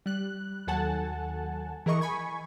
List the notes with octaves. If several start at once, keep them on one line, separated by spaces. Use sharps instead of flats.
G3 F#6
D#2 F#3 A4 F#5 G#5 A5
E3 G#4 A#4 D#5 C#6
G#5 B5 C#6 G#6